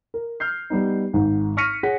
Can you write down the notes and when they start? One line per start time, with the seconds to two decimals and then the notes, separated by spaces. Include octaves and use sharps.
0.14 A#4
0.40 F6 G6 C7
0.70 G3 B3 D#4
1.13 G#1 G#2
1.57 C#6 F6 A#6 B6 C#7 D#7
1.83 G#4 C#5 F#5 B6